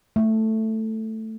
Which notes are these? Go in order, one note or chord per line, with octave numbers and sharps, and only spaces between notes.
A3